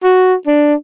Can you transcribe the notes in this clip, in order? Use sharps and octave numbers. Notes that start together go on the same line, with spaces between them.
F#4
D4